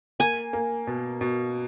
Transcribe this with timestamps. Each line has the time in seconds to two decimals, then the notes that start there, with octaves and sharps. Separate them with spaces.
0.20 A#3 G#5
0.53 A#3
0.87 B2
1.21 B2